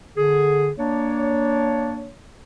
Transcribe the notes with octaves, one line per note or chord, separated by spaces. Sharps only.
D3 G#4
A#3 D4 C#5